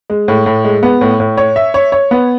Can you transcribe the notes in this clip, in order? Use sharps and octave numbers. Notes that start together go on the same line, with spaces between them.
G#3
A2
A2
G#3
B3
A2
A2
C#5
E5
C#5
C#5
B3